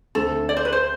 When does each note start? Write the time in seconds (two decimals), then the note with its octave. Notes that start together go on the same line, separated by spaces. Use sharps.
0.15 D2 D3 A3 C4 A4
0.49 D5
0.57 C5
0.65 B4
0.72 C5